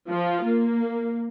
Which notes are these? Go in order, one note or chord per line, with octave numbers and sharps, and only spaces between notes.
F3 F4
A#3